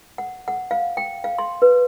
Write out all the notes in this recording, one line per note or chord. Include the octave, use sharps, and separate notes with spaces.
F#5
F#5
F5
G5
F5
C6
B4